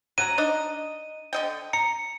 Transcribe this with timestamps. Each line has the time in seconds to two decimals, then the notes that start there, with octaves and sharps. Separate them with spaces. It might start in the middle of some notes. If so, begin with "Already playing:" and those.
0.18 F#3 F#5 A#5 D#7
0.38 D4 D#4 D#5
1.33 D3 D#5 G5
1.73 A#5 C#7